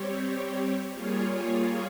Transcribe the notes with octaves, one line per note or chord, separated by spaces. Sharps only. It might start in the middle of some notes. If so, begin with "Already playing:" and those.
Already playing: G3 C4 G4 C#5
G3 A#3 F4 G#4 C#5